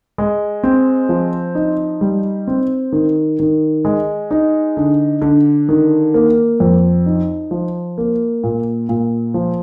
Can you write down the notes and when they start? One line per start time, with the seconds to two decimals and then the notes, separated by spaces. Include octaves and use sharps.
0.18 G#3
0.64 C4
1.09 F3
1.55 D#4
2.01 G3
2.48 C4
2.92 D#3
3.39 D#3
3.85 G#3
4.31 D#4
4.77 D3
5.22 D3
5.69 D#3
6.14 A#3
6.60 F2
7.06 D#4
7.51 F3
7.98 A#3
8.44 A#2
8.89 A#2
9.34 F3